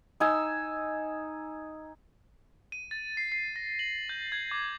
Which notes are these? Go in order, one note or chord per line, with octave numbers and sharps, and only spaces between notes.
D#4 G#5 E6
D#7
A6
C7
C7
A#6
F#7
G6
G#6
D6